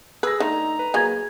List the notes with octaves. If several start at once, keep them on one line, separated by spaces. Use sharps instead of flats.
G#4 B4 E6 A#6
D3 A3 D#4 A#5
B4
F#3 A#3 G#4 G#5 G#6